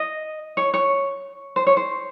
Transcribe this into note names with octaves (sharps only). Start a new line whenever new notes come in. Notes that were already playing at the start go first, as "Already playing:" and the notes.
Already playing: D#5
C#5
C#5
C5
C#5
C5